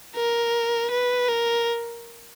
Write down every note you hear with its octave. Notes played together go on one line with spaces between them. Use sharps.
A#4
B4
A#4